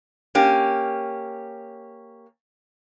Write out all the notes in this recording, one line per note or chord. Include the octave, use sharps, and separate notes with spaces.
A#3 C#4 G4